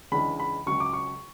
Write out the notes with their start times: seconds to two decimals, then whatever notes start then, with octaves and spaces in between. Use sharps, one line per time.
0.12 C#2 C#3 E3 G#3 D4 B5
0.39 B5
0.66 C#2 C#3 F#3 C#6
0.80 D6
0.93 C#6